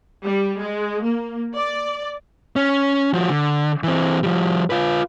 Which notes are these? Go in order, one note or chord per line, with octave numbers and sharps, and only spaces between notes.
G3
G#3
A#3
D5
C#4
F3 F#4
D3
E3 C4
F3 G3
F4 B4